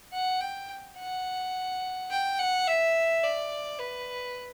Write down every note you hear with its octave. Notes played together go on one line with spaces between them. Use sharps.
F#5
G5
F#5
G5
F#5
E5
D5
B4